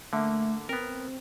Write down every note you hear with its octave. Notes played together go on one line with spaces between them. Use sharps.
D3 A3 A#3
B3 C4 A#4